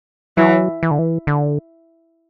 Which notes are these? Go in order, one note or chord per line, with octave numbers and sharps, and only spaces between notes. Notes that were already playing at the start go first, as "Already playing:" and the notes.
E3 F#3
E3
D3
E3
D3